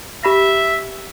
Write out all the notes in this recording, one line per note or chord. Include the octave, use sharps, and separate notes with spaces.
G4 E5 B5 A#6